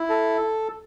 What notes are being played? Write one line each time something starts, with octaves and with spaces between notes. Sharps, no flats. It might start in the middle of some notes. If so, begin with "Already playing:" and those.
Already playing: E4
A4